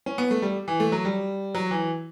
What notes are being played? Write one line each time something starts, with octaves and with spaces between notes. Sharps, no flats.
C#4
B3
A3
G3
E3
A3
F#3
G3
F#3
E3